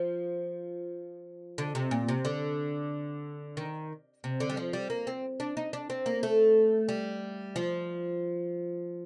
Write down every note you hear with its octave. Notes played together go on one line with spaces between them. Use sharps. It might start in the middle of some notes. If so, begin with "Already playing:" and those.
Already playing: F3
D3
C3
A#2
C3
D3
D#3
C3
D3
G3
F3
G3
A#3
C4
D4
D#4
D4
C4
A#3
A3
G3
F3